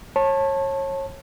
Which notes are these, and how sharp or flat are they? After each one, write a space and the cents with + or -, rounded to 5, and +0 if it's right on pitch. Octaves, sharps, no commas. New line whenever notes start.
C#5 -30 A5 +0